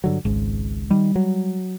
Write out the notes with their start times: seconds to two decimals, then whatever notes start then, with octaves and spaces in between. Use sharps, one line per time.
0.04 G2 D3 F#3
0.25 G#1 C#2 G#2
0.91 D#3 G3
1.16 F#3